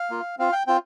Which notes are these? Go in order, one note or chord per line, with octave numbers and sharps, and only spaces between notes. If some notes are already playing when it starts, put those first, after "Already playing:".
Already playing: F5
A#3 F4
C4 F4 F5
G5
C4 F4 G5